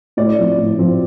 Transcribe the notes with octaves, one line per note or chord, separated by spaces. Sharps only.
A2 D5
F3 C4
A2
F3 C4